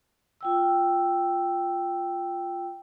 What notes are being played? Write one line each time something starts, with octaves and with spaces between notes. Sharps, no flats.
F4 G5 E6